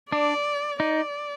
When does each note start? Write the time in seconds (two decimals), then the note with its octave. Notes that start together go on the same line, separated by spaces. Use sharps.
0.11 D4 D5
0.80 D#4 D5